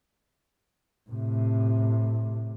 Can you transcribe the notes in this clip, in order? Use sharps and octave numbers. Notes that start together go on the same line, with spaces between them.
A2 C3